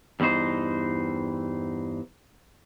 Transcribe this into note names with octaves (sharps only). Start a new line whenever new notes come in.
E2 G2 E3 D#4 C5